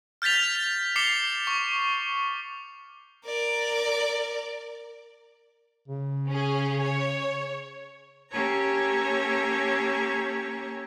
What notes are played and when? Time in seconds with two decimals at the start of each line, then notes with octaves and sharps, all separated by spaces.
0.22 F6 G6 A6 B6 F7
0.55 F7
0.96 D6 C7 C#7 F7 G7
1.47 C#6
3.25 A#4 D5
5.88 C#3
6.28 C#4 G#4
6.81 C#5
8.31 A#3 C#4 G4 A4 C#5 A#5